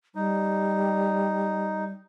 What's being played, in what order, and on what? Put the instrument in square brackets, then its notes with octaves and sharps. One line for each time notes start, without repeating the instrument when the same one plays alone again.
[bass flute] G3 [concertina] D#4